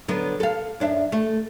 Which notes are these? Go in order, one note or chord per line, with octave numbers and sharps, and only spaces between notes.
D3 F#3 B3
A4 F5
F#2 D4 E5
A3